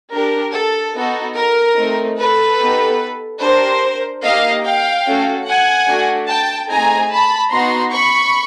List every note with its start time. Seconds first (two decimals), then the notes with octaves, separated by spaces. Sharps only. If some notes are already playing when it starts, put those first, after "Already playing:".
0.12 D4 G4 A#4
0.55 A4
0.95 B3 D#4 F#4 A4
1.36 A#4
1.77 A3 C4 D#4
2.18 A4 B4
2.59 B3 D#4 G4
3.41 D4 G4 A#4 C5
4.23 A#3 D#4 G4 D#5 F5
4.65 F5 G5
5.06 A3 C#4 F#4 A4
5.47 F#5 G#5
5.88 A3 D4 F#4
6.28 G5 A5
6.70 A3 C4 D#4 G#4 G#5 A#5
7.11 A5 B5
7.52 B3 D#4 F#4 A#5 C6
7.93 B5 C#6